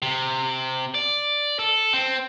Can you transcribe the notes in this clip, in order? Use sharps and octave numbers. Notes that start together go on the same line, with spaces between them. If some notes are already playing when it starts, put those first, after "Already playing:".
C3
D5
A4
C4